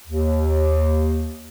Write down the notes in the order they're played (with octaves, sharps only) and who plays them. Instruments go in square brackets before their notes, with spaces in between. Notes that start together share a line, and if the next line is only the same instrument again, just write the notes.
[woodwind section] D#2